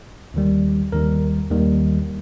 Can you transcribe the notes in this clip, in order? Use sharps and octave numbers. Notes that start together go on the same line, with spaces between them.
D#2 D#3 G3
D#2 D#3 G3 A#4
D#2 D#3 G3